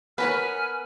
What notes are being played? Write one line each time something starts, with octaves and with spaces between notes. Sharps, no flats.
B3 A#4 B4 C#5 G#5 F6